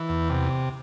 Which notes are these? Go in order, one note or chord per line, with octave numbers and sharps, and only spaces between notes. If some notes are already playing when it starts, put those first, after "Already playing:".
Already playing: E3
E2
C3